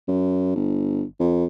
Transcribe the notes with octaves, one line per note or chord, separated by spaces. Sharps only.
F#2
G1
F2